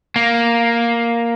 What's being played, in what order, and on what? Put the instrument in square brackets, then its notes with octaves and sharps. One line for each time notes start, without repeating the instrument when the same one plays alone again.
[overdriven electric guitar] A#3